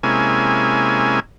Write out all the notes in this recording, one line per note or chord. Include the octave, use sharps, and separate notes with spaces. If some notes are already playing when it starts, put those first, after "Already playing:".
C3 G#3 A#3 C#4 E4 G#5